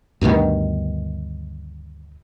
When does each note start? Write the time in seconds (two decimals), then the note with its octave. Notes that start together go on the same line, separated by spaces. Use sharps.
0.21 D2 G2 B2 D#3